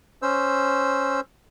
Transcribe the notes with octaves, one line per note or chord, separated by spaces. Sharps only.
C#4 C5 E6